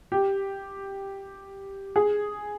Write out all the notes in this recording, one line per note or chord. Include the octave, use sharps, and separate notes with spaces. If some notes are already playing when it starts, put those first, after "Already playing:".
G4
G#4